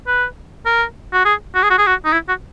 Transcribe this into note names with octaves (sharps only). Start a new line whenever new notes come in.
B4
A#4
F#4
G#4
F#4
G#4
F#4
G#4
F#4
D#4
E4
F#4